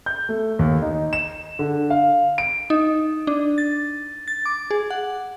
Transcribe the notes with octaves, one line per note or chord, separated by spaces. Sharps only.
G6
A3
D#2
D#4
E7
D3
F5
D7
D#4
D4
A6
A6
D6
G#4
F#5